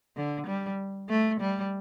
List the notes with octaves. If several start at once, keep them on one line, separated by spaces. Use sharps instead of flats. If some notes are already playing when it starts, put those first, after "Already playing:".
D3
G3
A3
G3